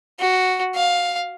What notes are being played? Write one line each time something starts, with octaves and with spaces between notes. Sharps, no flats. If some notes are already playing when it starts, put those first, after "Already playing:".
F#4
F5